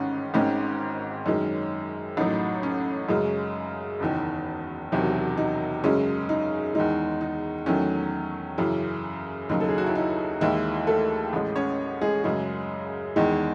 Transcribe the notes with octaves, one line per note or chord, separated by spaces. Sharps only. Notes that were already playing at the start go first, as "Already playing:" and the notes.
Already playing: A1 G#2 D#3 C#4
G#1 G#2 D#3 C#4
F#2 D#3 G#3
A1 A2 F#3 D#4
C#4
F#2 C#3 G#3
F#1 E2 D#3
E1 E2 C3 D#3 E3 F#3 E4
D#4
F#2 C#3 G#3 C#4
D#4
E2 D#3 G#3 D#4
D#4
E2 D#3 F#3 A3 C#4
F#2 C#3 E3
D#2 C#3 F#3 D#4
A4
G#4
F#4
E4
D#4
D#2 D#3 E3 G#3 E4
A3 A4
A1 A2 G#3
C#4 C#5
G#3 G#4
F#2 C#3 G#3
E2 D#3 G#3